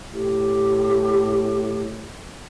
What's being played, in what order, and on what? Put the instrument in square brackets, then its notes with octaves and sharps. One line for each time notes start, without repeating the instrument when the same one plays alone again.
[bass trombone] A2 [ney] G4